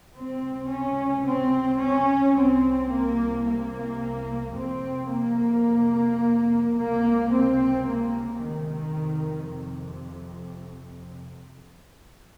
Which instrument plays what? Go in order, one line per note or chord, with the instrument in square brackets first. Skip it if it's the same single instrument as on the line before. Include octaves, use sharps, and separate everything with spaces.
[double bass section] C#2 C3 C4
C#4
C4
C#4
C2 C3 C4
A#3
A#3
F2 C3 C4
A#3
C#2 C3 A#3
C4
A#3
D#3
F2 C3